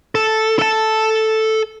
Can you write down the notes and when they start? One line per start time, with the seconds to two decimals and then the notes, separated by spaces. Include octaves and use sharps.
0.15 A4
0.59 A4 A5